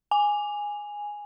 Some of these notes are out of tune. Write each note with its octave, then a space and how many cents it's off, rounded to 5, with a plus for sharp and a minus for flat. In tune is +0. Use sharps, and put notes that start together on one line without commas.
G#5 -5